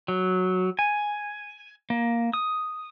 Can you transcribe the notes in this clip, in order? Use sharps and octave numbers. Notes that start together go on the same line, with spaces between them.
F#3
G#5
A#3
D#6